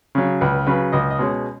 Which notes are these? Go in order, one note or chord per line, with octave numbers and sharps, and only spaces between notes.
C#3 F#3
C#2 B4
C#3 F#3 B4
C#2 D#5
D#5
B2 G#3 C#4